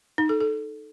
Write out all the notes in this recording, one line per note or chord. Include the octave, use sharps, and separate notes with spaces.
D#4
A4
A4